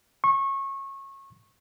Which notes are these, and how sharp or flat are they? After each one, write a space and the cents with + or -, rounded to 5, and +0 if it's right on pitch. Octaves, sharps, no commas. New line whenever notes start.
C#6 -25